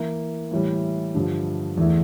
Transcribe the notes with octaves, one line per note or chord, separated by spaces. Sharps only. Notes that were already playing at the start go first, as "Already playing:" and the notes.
Already playing: E3 A#3 E4
A2 E3 G3
G2 D3 F3
E2 E3 A3